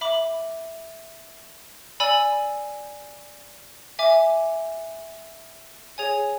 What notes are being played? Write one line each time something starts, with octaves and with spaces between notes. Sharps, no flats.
E5 B5 D6
D5 G#5 B5 E6
E5 G#5 D6
G#4 C#5 G#5